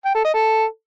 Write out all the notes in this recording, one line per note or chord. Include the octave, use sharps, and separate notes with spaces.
G5
A4
D#5
A4